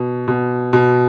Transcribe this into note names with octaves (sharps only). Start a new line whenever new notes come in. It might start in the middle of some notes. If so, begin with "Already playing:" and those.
Already playing: B2
B2
B2